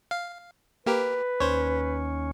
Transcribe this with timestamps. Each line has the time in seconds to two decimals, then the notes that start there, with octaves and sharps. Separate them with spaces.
0.11 F5
0.86 A#3 G4 A#4 B4
1.40 D#2 C#4 C5 C#5